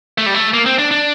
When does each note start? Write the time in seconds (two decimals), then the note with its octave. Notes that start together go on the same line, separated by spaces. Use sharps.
0.18 A3
0.26 G3
0.34 A3
0.54 A#3
0.66 C4
0.79 D4
0.91 D4